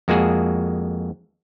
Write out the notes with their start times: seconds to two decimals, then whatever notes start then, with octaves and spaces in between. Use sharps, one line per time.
0.08 F2 G#3 A#3 F#4 G#4